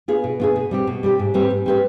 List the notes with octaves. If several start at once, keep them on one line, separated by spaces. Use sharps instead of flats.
B3 F4 G#4
B2
B3 F4 G#4
B2
G3 C4 G4
B2
G3 C4 G4
G#2
G3 C4 G4 B4
G#2
G3 C4 G4 B4